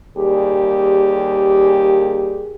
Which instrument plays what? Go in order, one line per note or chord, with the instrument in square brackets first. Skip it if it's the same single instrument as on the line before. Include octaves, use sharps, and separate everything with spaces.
[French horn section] D#2 G3 G4 G#4